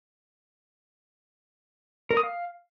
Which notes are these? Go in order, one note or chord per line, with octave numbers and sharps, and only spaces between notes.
A#4
D#6
F5